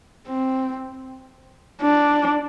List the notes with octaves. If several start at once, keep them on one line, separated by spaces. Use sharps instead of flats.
C4
D4